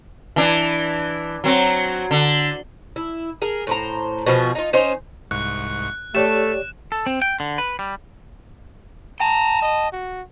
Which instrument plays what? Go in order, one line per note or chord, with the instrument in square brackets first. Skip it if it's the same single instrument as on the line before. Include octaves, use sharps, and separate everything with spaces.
[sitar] E3 D4
F#3 C4
D3
[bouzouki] E4
G#4 A#4
A2 C5 A#5
B2 F3 G#4
D#4 F4
C#4 D#4 C5
[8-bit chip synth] C2 G#2 C#6 [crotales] F#6
[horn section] A3 [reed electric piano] G4 C#5 D5 [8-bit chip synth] A5 [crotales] E7
[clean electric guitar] A4
C4
G5
D3
B4
G3
[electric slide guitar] G5 A5 [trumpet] A#5
[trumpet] D#5
F#4